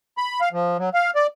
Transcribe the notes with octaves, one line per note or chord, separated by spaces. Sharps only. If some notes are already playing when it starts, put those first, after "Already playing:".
B5
F5
F3
F#3
F5
D5